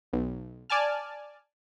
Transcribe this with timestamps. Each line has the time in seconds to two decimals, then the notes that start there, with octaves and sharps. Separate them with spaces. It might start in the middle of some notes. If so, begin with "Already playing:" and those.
0.13 B1
0.70 D5 G#5 A5 F6